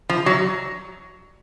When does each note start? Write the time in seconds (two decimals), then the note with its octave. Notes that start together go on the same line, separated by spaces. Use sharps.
0.09 F3
0.26 F#3